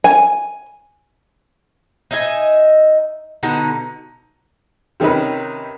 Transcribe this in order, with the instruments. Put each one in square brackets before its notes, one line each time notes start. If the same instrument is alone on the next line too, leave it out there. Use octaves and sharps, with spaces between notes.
[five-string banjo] G#5
[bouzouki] D#4 D#5 E5 G#5
B2 D3 D#4 F#5
[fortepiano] C3 D#3 C#4 D#4 B4